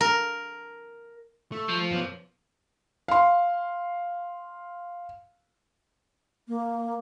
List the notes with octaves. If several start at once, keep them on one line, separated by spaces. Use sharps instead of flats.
A#4
A3
F3
F#2 B3
F5 C6
A#3